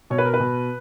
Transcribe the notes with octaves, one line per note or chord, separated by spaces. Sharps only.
B2 C#5
B4
A#4
B4
B2